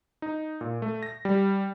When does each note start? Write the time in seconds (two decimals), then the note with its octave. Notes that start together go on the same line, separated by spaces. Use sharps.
0.22 D#4
0.61 A#2
0.82 A3
1.03 A#6
1.25 G3